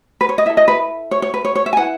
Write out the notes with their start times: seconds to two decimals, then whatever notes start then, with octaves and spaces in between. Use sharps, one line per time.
0.21 B4
0.29 C#5
0.38 D#5
0.46 E4 A4 E5
0.57 D#5
0.68 B4
1.11 C#5
1.22 C#5
1.34 B4
1.45 C#5
1.55 C#5
1.66 E5
1.73 G#5
1.77 E4 B4 F#5